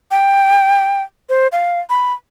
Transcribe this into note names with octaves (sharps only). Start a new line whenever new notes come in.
G5
C5
F5
B5